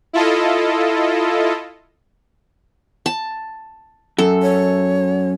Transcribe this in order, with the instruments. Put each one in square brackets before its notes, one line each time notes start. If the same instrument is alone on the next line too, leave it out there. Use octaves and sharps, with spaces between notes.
[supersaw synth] E4 F4 A4 D#5
[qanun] A5
[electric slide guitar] F#2 [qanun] A4
[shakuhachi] C#5